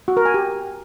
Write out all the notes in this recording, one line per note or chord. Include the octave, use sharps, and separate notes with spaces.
F#4
A#4
G#5
G4